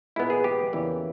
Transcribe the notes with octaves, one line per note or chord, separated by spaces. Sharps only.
A#2 G#3 B3 E4
G#4
G4
E2 C#3 E3 G3 A#3